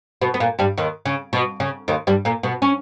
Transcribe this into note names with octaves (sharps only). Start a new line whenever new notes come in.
B2 B3
B3
A#2 A#3
G2 G3
D#2 D#3
C#3
B2
C#3
D#2 D#3
G2 G3
A#2 A#3
B2 B3
C#4